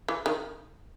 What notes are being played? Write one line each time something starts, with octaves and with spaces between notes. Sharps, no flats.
E3
D#3